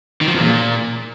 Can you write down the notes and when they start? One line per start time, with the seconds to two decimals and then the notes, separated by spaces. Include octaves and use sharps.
0.21 D#3
0.28 F3
0.34 E2
0.41 A#2